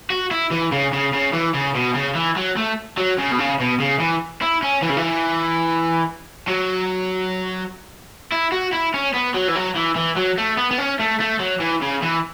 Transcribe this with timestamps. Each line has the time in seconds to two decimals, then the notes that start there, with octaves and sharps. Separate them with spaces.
0.10 F#4
0.31 E4
0.51 E3
0.72 C#3
0.93 C#3
1.13 C#3
1.33 E3
1.54 C#3
1.75 B2
1.94 C#3
2.15 E3
2.36 F#3
2.57 A3
2.97 F#3
3.18 C#3
3.31 B2
3.39 C#3
3.60 B2
3.80 C#3
4.00 E3
4.42 E4
4.63 C#4
4.82 E3
4.89 C#3
4.97 E3
6.47 F#3
8.32 E4
8.52 F#4
8.73 E4
8.94 C#4
9.14 B3
9.34 F#3
9.48 E3
9.56 F#3
9.76 E3
9.96 E3
10.17 F#3
10.38 A3
10.57 B3
10.71 B3
10.78 C#4
11.00 A3
11.20 A3
11.39 F#3
11.60 E3
11.82 C#3
12.02 E3